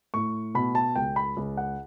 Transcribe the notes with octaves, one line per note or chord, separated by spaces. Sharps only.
A2 C#6
B2 B5
A5
C#2 G5
B5
C#2
F#5